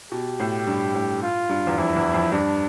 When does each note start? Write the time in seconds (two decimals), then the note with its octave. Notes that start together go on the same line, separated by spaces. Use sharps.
0.12 B2 G4
0.40 A2
0.67 G2
0.95 A2
1.23 F4
1.49 G2
1.67 E2
1.78 F2 E4
1.96 E2
2.14 F2
2.32 G2 D4